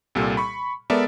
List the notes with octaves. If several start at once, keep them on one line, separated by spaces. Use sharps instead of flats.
C2 A#2 G3 A4
B5 C#6
G#3 B3 A4 A#4 D5 E5